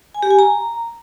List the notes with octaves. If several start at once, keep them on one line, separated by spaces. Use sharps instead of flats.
G#5
G4
G#5
A#5